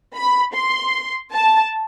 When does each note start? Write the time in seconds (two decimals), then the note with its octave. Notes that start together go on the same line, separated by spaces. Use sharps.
0.15 B5
0.54 C6
1.32 A5